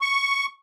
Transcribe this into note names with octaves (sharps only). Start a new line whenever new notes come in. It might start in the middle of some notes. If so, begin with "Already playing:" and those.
C#6